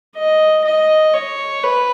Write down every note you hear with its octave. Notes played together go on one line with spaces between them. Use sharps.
D#5
D#5
C#5
B4